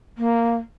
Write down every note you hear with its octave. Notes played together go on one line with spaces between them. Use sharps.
A#3